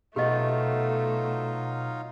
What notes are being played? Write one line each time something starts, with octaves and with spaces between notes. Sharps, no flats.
B2 F#3 A3 B3 D#4 F4 G4 D#5